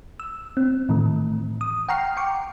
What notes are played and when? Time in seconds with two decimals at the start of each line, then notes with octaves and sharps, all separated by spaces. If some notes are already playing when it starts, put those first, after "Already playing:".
0.20 E6
0.57 C4
0.89 A2 D#3 E3 A3
1.61 D#6
1.89 F#5 G5 A#5 C#6 F6 C7
2.17 G5 C#6 D6